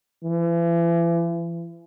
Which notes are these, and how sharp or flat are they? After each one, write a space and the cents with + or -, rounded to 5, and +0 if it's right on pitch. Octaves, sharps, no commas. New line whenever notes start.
E3 +40